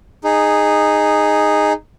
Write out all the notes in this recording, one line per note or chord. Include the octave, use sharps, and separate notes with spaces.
D#4 G#4